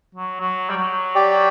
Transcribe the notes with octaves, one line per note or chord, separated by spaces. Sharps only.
F#3
F#3
G3
F#3
G4 D5 G5